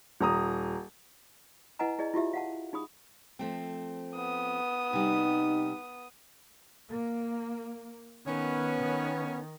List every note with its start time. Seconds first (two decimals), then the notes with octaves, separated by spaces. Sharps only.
0.21 D#1 A#5 D#6
1.79 E4 B4 D#5 F#5 G#5 A#5
1.99 E4 G#4 D5 D#5
2.14 E4 F4 G4 E5
2.33 F5 F#5 A5
2.73 D#4 G#4 B5 D#6
3.39 F3 A3 C4
4.16 B3 D#6
4.93 C3 G3 D#4
6.89 A#3
8.26 D#3 B3 C#4
8.78 D#3